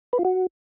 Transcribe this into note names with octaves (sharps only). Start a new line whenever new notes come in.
B4
F4
F#4